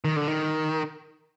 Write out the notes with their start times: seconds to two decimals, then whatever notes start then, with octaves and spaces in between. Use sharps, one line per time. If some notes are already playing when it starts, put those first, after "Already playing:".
0.05 D#3
0.16 D3
0.28 D#3